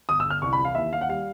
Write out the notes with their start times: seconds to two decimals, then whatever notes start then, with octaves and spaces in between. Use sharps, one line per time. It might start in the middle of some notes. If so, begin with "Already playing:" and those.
0.09 G1 D#6
0.20 D3 E6
0.30 F6
0.42 C2 C#6
0.53 B5
0.59 E3
0.65 F5
0.75 D#2 E5
0.92 D#2 F5
1.01 F#5
1.09 G3 F5